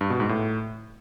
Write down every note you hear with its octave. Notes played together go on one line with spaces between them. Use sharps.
G2
B2
G#2
A2